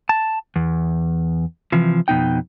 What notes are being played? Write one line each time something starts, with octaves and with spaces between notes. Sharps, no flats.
A5
E2
C3 E3 F3
F2 B2 D#4 G5